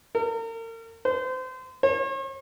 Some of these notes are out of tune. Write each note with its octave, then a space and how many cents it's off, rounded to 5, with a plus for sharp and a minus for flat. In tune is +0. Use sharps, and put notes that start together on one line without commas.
A#4 -40
C5 -30
C#5 -45